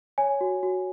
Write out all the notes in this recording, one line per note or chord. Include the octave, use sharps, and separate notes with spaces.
C#5 G#5
F#4
F#4